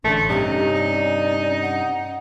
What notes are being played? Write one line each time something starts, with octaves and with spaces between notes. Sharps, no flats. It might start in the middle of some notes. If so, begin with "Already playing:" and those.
A1 D3 A3 C#4
G2 C3 D#4 G4
D5
F#5